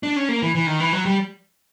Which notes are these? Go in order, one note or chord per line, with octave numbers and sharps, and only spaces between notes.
D4
C#4
A#3
E3
E3
D#3
E3
F#3
G3